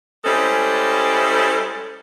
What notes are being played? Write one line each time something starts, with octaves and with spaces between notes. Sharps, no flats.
G3 G#3 C#4 E4 A4 C5